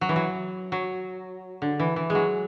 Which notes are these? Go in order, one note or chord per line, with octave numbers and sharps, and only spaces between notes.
F#3
E3
F#3
F#3
D3
E3
E3
G#3
F#3